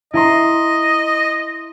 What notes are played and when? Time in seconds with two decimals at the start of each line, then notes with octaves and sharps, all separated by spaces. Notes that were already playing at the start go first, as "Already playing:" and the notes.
0.14 E4 D#5 A#5 C6